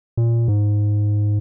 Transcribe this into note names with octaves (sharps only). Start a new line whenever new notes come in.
A#2
G#2